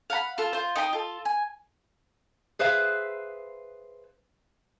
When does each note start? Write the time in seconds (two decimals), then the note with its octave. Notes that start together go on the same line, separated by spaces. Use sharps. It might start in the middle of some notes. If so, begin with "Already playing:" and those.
0.10 F5 F#5 A#5 B5
0.38 F4 A4
0.53 F4 C5
0.76 D#4 G5 B5 D#6
0.93 F4 A4
1.25 G#5
2.59 G#4 B4 C5 E5 F5